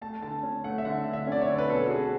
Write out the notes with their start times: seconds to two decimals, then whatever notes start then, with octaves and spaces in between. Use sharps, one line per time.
0.01 A3 A5
0.22 D3 A5
0.43 C#4
0.64 A3 F#5
0.78 E5
0.85 D3 F#5
1.06 D3
1.13 E5
1.27 C#4 D5
1.41 C#5
1.49 D3
1.58 B4
1.69 B2 A4
1.87 F#4
1.90 C#4 G#4